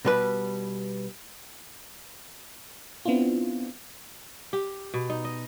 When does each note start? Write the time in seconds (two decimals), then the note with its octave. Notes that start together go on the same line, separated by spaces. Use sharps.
0.05 B2 G3 B4
3.06 B3 C4 D4 E4 F4
4.53 G4
4.94 B2
5.10 D#4
5.25 D#5